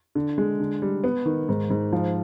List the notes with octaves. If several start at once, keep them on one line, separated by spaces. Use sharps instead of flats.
D3
G#3
D3
G3
B3
D#3
G#2
G#2
F3